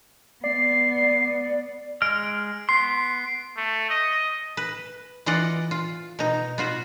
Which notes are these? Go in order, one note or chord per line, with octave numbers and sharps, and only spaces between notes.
B3 D5 C7
G#3 D#5 F6 D7
B3 C6 C7
A3
D#5
B4
E3 F4 D5 D#5 F#5
F4
B2 D#4
B3 F4 F#4